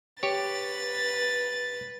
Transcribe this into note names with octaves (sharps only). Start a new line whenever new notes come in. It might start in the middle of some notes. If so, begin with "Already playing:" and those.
G4 B4 C#5 A6